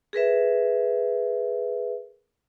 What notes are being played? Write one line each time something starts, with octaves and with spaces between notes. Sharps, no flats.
G#4 A#4 B4 E5